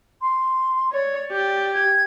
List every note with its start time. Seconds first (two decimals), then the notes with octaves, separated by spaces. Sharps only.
0.21 C6
0.93 C#5 D5
1.32 G4
1.72 G#6